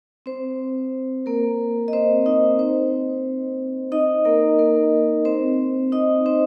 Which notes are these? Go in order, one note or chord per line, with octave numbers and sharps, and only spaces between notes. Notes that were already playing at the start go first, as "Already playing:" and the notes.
C4 C5
A#3 A#4
D#5
C4 C5
D#4 D#5
C4 C5
D#4 D#5
A#3 A#4
A#3 A#4
C4 C5
D#4 D#5
C4 C5